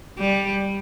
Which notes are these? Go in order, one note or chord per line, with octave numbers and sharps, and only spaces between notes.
G3